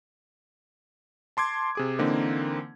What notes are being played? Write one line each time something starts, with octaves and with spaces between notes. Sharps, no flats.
A5 C6 D6 G#6
C3 G#4 D6
D3 E3 A#3 C4 D#4